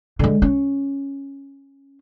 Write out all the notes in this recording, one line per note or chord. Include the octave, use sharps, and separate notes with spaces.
D3 G#3
C#4